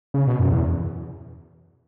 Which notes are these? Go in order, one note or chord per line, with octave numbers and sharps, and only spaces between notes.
C#3
B2
F#2
E2